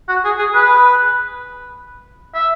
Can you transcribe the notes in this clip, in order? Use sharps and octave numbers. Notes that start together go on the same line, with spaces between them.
F#4
G#4
G#4
B4
E5